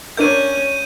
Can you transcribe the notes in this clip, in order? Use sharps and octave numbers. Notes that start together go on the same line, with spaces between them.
C#4 D4 A#4 C#5 E5 G6 D#7